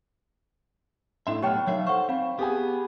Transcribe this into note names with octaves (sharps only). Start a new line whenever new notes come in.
A2 D4 E5 C6
B1 A2 B3 G4 C#5 G5 A5 F6
F#3 D#4 A#4 C#5 E5 F5
A4 C5 F#5 C#6
C4 F5 B5
B3 G4 G#4 G#5